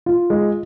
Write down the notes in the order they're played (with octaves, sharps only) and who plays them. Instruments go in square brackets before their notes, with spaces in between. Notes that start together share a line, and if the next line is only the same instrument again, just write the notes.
[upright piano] F4
G#3